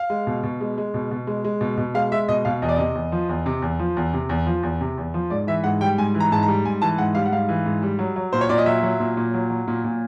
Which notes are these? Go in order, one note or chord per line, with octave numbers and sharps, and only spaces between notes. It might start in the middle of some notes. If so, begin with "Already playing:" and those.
Already playing: F5
G#3
B2
B2
G#3
G#3
B2
B2
G#3
G#3
B2
B2
G#3 F5
G#3 E5
B2 D#5
B2 F5
E2 D#5
D5
C3 D#5
E2
F3
E2
C3
E2
F3
E2
C3
E2
F3
E2
C3
E2
F3
G#2 D5
E3 E5
G#2 F#5
G3 G5
G#2 G#5
E3
A#5
G#2 A5
A#5
G3
G#2 G#5
E3 A5
G#2 F#5
G3 F5
F#5
G#2 F5
E3
G#2
G3
F#3
F#3
A#2 C5
C#5
A#2 D5
D#5
F#3 E5
F#3
A#2
A#2
F#3
F#3
A#2
A#2